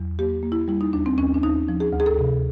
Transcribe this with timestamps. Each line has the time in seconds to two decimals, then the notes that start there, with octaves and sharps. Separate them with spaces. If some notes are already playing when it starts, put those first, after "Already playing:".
Already playing: E2 F#3
0.19 A#3 G4
0.43 A#3
0.52 E4
0.68 G3 E4
0.81 D#4
0.93 D#2 D4
1.06 C4
1.18 D#2 C#4
1.34 D4
1.43 D#2 D#4
1.68 F3
1.80 G#4
1.93 D2
2.00 G#4
2.06 A4
2.19 C3